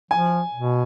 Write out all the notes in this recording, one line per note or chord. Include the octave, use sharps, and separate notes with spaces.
F3 G#5
B2